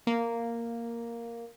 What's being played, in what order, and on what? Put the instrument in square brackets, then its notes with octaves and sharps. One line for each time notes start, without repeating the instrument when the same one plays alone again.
[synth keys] A#3